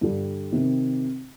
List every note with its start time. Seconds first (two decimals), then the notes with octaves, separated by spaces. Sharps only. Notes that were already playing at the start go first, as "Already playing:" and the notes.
0.01 G2 D3 G3
0.52 C3 D#3